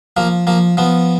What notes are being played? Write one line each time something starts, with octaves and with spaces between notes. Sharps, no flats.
F3 A#3
F3 A#3
F3 B3